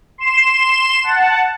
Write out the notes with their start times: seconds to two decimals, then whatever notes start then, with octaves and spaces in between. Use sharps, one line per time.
0.18 C6 E7
1.04 F#5 A5